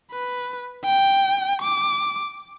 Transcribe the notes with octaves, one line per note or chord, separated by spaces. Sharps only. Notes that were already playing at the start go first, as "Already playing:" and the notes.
B4
G5
D6